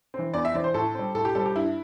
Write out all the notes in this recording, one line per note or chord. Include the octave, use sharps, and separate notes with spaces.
E3 C4
E2 D5
E5
E3 C4 D5
C5
A2 A4
G3 C4
A2 A4
G4
G3 C4 A4
G4
G2 E4